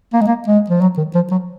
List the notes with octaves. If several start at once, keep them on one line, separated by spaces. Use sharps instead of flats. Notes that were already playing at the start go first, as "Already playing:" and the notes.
A#3
G#3
A#3
G#3
F3
F#3
D#3
F3
F#3